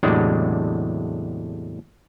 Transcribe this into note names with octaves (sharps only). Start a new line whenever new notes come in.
E2 A2 C3 F#3 G#3 D4